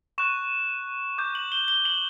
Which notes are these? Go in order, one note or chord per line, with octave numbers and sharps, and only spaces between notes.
C#6 F#6 E7
D6 G6
F#7
G7
G7
F#7